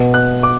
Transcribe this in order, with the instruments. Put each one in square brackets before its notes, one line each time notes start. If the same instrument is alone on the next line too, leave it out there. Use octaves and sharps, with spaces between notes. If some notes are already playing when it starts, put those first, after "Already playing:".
Already playing: [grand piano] B2 B3
F#6
D6